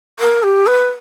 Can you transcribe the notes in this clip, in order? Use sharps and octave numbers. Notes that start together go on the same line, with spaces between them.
A#4
G4
B4